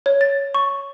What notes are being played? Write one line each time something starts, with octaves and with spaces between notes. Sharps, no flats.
C#5
A6
C#6